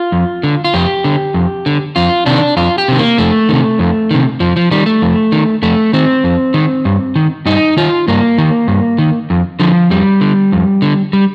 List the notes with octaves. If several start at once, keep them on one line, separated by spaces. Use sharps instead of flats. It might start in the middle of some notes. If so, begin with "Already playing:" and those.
Already playing: F4
F2
D3
F4
F2 G4
D3
F2
D3
F2 F4
C3 D#3 D4
F2 F4
G4
C3 D#3
A#3
F2 A3
C3 D#3
F2
C3 D#3
F2 F3
F3
D#3 G3
A3
F2
D#3
F2 A3
D#3 C4
F2
D#3
G2
D#3
G2 D#4
D#3 F4
G2 A#3
D#3
G2
D#3
F2
D3 F3
F2 G3
D3
F2
D3
G3